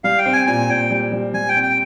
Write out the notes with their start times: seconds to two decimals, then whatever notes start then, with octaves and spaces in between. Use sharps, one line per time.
0.04 G3 F5
0.18 G5
0.26 C4
0.33 G#5
0.47 A#2 G#5
0.69 A#2 G5
0.91 G3
1.12 G3
1.34 G3 G#5
1.49 G5
1.56 C4
1.63 G5